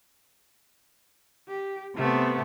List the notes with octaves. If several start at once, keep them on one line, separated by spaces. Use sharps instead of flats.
G4
C3 A3 B3